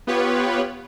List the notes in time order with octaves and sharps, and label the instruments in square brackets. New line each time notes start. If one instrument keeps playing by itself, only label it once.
[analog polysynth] B3 F4 G4 B4 C#5